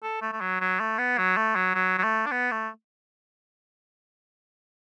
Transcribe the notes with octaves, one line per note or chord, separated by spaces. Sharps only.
A4
A3
A3
F#3
F#3
A3
B3
F#3
A3
F#3
F#3
F#3
A3
D4
B3
A3